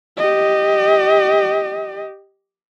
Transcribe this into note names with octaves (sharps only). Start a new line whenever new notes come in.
G4 D#5